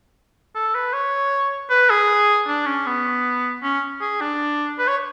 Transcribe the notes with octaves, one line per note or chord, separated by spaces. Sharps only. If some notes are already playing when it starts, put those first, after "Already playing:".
A4
B4
C#5
B4
G#4
D4
C#4
B3
C#4
G#4
D4
B4
C#5